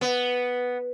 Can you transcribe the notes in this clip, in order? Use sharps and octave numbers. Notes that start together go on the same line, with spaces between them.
B3